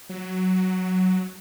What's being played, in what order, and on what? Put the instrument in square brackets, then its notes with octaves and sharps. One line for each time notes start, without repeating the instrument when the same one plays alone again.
[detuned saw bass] F#3